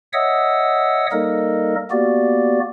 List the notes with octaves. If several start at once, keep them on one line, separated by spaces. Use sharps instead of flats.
C#5 D#5 E5 F#5 D#6 E6
G3 A#3 D#4 A4 A#4 D#5
A#3 B3 F#4 G4 D5